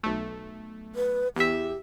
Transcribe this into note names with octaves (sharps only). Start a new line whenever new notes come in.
B1 A3
B4
E2 G4 E5